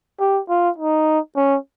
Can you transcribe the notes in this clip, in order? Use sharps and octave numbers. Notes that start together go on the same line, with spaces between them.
G4
F4
D#4
C#4